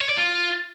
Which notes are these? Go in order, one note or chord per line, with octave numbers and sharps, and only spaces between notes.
C#5
D5
F4